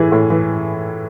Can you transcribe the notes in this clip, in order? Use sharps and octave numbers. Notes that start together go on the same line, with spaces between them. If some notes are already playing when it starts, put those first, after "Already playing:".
Already playing: A2 E3 E4 G#4
A2
E3